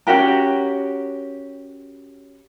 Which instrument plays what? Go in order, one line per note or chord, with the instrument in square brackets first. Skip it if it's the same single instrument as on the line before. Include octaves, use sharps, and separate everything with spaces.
[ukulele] C#4 F#4 G4 A#4